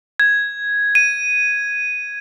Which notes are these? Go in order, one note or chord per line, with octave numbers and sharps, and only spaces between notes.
G#6
D#7